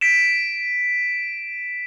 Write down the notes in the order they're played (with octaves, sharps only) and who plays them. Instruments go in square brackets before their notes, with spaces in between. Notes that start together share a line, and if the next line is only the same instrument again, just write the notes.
[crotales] B6 D7 E7